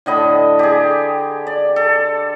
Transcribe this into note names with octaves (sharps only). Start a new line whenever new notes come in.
A2 D3 D#5 B5
G4 G#4
D5
A4